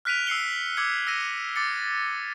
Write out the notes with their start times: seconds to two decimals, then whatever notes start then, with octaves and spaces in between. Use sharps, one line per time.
0.05 F6 F#6 B6 D7 D#7 F7
0.27 E6 C7 C#7 G7
0.77 D6 E6 G#6 C#7
1.07 E6 A#6 D#7
1.56 D6 A6 C#7